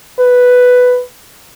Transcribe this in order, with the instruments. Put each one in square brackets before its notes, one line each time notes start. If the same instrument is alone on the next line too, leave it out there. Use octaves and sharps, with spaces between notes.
[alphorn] B4